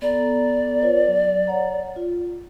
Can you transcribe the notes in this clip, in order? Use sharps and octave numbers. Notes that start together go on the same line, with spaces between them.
B3 A4 D5 A#5
F4 B4 C#5
F#3
C#5 F#5 A#5
F4